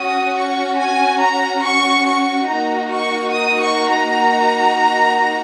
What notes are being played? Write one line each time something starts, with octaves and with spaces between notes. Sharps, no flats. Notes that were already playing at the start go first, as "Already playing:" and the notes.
Already playing: C#4 F#4 D#6
C#6
G#5
A#5
C#6
C#6
A#3 D#4 F#4 A#5
C#6
D#6
C#6
A#5